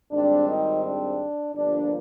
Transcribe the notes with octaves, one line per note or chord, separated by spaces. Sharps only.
G#1 G#2 G3 C4 D4
D#3 D#4
D4
G1 G2 F3 A#3 D4